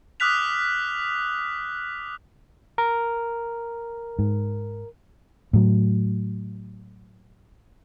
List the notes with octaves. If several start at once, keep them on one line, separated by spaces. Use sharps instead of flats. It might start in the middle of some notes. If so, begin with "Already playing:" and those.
D6 D#6 F6 F#6 B6 F7
A#4
G#2
A2 F#3